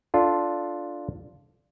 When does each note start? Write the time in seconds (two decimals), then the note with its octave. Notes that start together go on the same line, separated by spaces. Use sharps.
0.14 D4 F4 A4